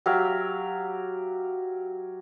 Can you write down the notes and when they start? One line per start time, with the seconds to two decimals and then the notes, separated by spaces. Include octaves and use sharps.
0.06 F#3 G4 E5 F5